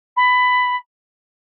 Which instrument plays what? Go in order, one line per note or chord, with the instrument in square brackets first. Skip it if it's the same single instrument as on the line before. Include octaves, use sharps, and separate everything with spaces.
[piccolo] B5